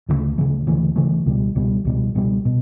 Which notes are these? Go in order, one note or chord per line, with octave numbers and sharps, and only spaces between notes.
D2 C#3 E3 A3
D2 C#3 E3 A3
D2 C#3 E3 A3
D2 C#3 E3 A3
C#2 B2 G3
C#2 B2 G3
C#2 B2 G3
C#2 B2 G3
B2